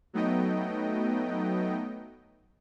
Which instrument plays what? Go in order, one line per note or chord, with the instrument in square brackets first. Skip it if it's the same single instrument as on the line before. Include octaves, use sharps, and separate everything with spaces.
[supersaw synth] F#3 A3 B3 D#4 D#5 G5